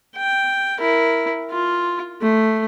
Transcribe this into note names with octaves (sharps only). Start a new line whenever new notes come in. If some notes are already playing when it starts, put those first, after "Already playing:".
G5
E4 A#4
F4
A3